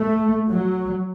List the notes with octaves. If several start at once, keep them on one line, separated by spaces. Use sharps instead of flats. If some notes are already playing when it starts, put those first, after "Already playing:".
Already playing: A3
F#3